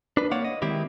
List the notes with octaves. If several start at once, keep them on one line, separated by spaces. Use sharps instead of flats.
D4 B4
A#3 C#5 D5 F5 F#5
D#5
D#3 G#3 C4 E4 G4